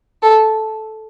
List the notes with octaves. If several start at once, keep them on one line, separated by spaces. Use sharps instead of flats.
A4